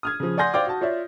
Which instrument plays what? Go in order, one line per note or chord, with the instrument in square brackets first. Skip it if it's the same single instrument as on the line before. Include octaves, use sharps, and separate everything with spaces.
[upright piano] D#6 F6 G#6
C#3 F3
D5 F#5 G#5 C6 G6 A#6
C5 D5 F5 G5 D6
F#4 A5
F4 C#5 D5 E5